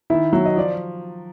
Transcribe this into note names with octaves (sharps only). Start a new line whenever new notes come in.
D#3 E4 E5
F#3 E5
D#5
F3 D5